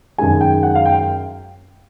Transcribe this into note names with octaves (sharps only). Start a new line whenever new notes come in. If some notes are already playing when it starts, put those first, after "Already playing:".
F#2 D#3 G#3 G#5
G5
F#5
F5
G5